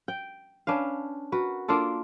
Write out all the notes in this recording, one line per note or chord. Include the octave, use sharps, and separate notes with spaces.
G5
C#4 D4 B4 F5
F#4 A#4 B4
A#3 D4 F4 A4